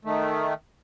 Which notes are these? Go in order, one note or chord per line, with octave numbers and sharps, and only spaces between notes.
D#3 A3